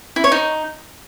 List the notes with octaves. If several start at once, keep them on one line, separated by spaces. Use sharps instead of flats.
E4
C#5
D#4